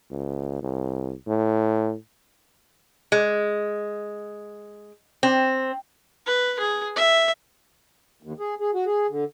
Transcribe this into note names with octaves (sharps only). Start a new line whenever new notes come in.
C#2
C2
A2
G#3
C4
B4
G#4
E5
D#2
G#4
G#4
F#4
G#4
D3